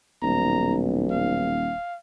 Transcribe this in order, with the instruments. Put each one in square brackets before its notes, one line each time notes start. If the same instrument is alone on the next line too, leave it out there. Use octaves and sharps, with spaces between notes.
[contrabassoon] D#1 [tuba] B1 [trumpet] A#5
[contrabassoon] D#1 [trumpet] F5